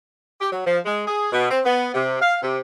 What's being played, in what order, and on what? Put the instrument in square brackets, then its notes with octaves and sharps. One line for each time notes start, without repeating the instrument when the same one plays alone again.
[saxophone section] G4
F#3
F3
G#3
G#4
B2
C4
B3
C3
F5
C3